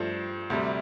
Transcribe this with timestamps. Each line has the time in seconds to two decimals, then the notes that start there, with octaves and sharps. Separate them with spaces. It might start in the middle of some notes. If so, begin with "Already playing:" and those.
Already playing: G2 F3 A3
0.50 D2 C3 G3